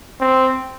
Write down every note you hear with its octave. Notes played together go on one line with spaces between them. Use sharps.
C4